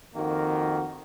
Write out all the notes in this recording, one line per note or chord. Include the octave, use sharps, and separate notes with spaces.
F2 D#3 A#3 F#4